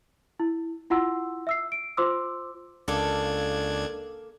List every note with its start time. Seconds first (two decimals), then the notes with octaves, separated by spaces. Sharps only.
0.40 E4
0.90 E4 F4 F#5 C6 E6
1.47 E5 E6 C7
1.72 D7
1.97 F4 C5 C6 D6 E6
2.88 C#2 A#3 D4 A4 G#6